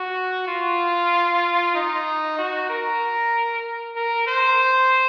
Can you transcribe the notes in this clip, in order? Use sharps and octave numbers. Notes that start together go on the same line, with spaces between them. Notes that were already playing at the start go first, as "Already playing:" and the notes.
Already playing: F#4
F4
D#4
F#4
A#4
A#4
C5